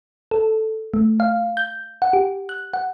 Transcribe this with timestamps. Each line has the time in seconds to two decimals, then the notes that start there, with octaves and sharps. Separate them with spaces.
0.31 A4
0.94 A3
1.20 F5
1.57 G6
2.02 F#5
2.13 G4
2.49 F#6
2.74 F#5